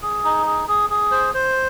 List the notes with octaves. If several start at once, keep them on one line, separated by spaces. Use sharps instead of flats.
G#4
D#4
G#4
G#4
G#4
C5
C5